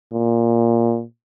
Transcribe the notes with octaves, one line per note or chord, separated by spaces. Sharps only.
A#2